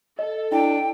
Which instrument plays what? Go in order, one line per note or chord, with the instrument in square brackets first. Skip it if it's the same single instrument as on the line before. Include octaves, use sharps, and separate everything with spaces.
[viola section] A4 [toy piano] D#5
[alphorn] D4 [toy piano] E4 [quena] G5